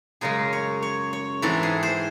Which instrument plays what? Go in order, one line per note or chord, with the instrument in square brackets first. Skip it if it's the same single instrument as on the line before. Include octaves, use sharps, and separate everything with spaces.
[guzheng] F#2 C#3 G#3 G#4
C#5
C#5
C#5
G#2 E3 C4 A4
G#4
C5